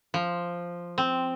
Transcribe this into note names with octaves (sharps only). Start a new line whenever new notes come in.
F3
C4